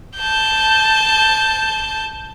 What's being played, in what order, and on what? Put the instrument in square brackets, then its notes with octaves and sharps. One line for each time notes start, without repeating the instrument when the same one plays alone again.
[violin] A5 G6